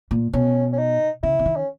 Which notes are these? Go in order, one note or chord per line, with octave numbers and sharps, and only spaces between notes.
A#2
B2 C#4
C#4
D#4
C#3 E4
C#3
D#3
C#4